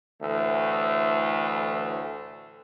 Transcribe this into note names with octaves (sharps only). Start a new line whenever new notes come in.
D2 A2 E3 A3